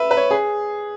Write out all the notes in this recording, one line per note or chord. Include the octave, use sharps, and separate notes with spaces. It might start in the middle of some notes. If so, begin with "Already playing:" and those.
Already playing: B4 E5
B4
C#5
G#4